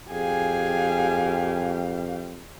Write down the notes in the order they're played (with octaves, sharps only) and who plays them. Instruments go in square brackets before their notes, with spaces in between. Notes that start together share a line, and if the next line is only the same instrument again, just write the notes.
[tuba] F2 [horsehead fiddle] G4 F5 [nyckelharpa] G#4 G#5